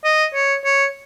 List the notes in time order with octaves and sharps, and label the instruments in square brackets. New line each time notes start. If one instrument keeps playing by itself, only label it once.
[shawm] D#5
C#5
C#5